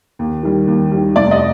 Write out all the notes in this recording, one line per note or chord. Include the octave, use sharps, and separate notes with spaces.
D#2
D#3 G3
D#2
D#3 G3
F1 D5
D#5